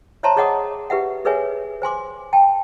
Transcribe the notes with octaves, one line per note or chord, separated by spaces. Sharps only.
C5 C#5 E5 A5 A#5 C6
G#4 C#5 D#5 F#5 D6 D#6
G4 B4 E5 F#5
G#4 A#4 B4 C#5 E5 G#5
C5 G#5 C6 D6
G5 A5